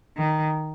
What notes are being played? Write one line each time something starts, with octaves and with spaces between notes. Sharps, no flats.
D#3